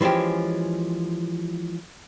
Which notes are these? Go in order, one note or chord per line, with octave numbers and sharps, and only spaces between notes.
E3 F3 G#3 C#4 G4